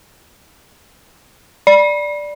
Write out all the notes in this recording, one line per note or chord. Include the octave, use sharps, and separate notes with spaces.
D5